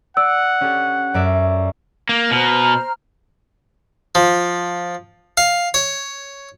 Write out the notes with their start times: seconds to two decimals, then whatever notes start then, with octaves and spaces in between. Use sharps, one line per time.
0.17 D5 F#5 E6
0.61 C#4 G4 A4
1.14 F#2 D5 E5
2.09 A#3
2.31 B2 C5 A#5 F6
4.15 F3
5.37 F5
5.74 C#5